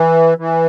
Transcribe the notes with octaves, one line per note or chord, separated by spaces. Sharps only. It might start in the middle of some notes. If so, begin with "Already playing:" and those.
Already playing: E3
E3